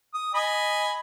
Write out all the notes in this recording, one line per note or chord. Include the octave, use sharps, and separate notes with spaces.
D#6
D#5 G#5 B5